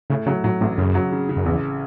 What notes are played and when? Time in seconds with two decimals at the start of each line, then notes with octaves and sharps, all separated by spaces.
0.10 A2 C#3
0.26 C#3 F#3
0.44 A2 F#3
0.61 A1 A2
0.78 F#2 C#3
0.95 F#3
1.12 C#3
1.29 C#3
1.37 F#2
1.46 A1 E2